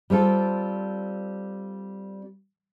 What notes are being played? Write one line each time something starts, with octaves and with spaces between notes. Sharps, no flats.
G3 C4 F4 A4